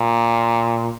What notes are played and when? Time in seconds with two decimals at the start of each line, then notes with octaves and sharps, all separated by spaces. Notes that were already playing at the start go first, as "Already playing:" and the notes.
Already playing: A#2